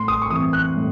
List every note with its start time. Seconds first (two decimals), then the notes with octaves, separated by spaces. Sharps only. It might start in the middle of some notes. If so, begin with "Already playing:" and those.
Already playing: A2 C6
0.08 D#6
0.22 C#6
0.30 E3 C4 D#6
0.53 F#6
0.76 A2